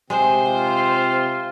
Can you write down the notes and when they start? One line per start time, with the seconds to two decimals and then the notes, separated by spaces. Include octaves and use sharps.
0.10 C3 G#3 C4 C5
0.47 F4